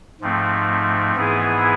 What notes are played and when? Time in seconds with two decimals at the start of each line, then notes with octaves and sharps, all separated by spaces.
0.21 G#2 F3 A3 C4
1.16 G#2 E3 B3 E4 G#4